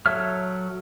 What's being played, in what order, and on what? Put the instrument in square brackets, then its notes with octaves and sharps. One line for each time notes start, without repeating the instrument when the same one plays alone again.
[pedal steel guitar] F#3 A4 C#5 E5 F6